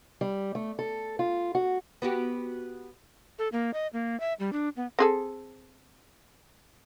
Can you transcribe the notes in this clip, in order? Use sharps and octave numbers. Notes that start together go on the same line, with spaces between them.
G3
A3
A4
F4
F#4
B3 F#4 G4
A4
A#3
D#5
A#3
E5
G3
D4
B3
C4 G#4 A4